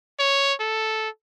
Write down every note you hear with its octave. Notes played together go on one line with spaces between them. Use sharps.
C#5
A4